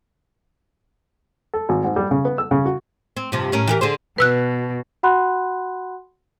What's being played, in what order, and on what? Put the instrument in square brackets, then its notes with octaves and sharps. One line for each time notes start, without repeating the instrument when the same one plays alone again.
[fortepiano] A4
G#1
G#2
G3
C#3
B3
E6
C#3
F#4
[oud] C4
G2 C3 F3
A2 C#4 A#4
E3 G4 A#4
D3 G#4 C5
[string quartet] B2 [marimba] B4 E6 F#6
[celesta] F#4 F#5 B5 C6 F#6